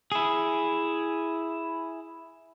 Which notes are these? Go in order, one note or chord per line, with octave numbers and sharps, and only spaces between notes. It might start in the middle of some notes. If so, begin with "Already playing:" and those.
E4 G#4